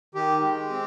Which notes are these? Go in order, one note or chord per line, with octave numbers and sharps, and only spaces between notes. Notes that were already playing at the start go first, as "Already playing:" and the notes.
D#3 G4
G#3
C4